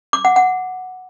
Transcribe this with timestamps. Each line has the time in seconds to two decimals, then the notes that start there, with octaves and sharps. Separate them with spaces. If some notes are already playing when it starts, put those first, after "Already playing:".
0.13 D6
0.25 F#5
0.36 F#5